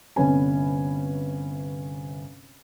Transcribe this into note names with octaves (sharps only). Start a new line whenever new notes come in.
G1 C3 C#4 B4 G#5